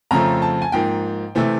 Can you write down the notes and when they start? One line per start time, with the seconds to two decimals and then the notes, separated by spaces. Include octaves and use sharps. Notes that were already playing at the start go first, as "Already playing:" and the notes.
0.11 F2 C#3 F3 A3 C4 A#5
0.42 A5
0.62 G#5
0.72 G#2 F3 A#3 G5
1.35 C3 E3 A3 C4